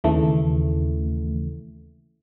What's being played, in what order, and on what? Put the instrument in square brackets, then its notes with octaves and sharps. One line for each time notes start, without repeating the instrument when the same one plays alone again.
[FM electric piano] D#2 C#3 E3 A3